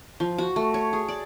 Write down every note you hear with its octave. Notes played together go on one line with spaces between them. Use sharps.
F3
F#4
A3
C#5
G#4
D5